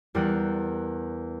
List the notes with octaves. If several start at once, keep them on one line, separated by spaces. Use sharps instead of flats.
E2 G3 G4 A#4 F#6